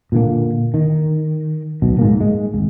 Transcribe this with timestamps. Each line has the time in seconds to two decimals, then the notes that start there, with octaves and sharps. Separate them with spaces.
0.12 A#2 D3 A#3
0.74 D#3
1.82 D1 B1 B2
1.99 G#2 A#3
2.20 G#3
2.54 D#1 G#1